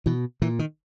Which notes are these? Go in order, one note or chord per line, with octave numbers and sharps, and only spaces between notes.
B2 E3
A#2 E3
D#3